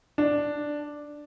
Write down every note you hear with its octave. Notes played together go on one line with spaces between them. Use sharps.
D4